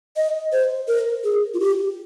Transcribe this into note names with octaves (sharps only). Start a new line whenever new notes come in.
D#5
C5
A#4
G#4
F4
G4